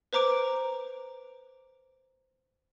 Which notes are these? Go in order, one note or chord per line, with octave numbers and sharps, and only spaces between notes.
B4 C5 A#5 D6 D7